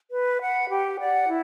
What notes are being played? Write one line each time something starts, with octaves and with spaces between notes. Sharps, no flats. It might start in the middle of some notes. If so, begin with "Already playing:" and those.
B4
F#5 B5
G4
D5 F#5
E4